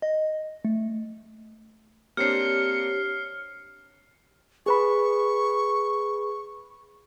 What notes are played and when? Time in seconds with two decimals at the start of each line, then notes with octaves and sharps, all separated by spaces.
0.02 D#5
0.65 A3
2.17 A#3 C4 D4 G4 C#5 F6 C7 C#7
4.66 G#4 B4 B5 C#6